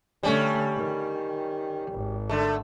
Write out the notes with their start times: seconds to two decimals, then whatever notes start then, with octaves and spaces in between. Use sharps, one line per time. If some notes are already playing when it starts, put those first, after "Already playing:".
0.23 D3 G3 A3 C#4
0.77 D#3
1.92 G#1
2.29 D3 A3